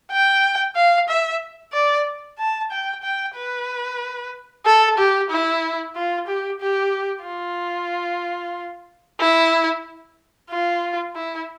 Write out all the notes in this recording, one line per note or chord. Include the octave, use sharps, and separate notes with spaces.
G5
F5
E5
D5
A5
G5
G5
B4
A4
G4
E4
F4
G4
G4
F4
E4
F4
E4